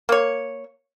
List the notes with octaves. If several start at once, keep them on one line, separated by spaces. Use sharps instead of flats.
A#3 C#5